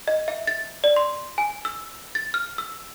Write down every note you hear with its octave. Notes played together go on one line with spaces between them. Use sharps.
D#5
E5
A6
D5
C6
G#5
E6
A6
F6
E6